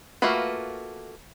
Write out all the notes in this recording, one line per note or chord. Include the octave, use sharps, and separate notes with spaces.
A3 A#3 F4 F#4 B4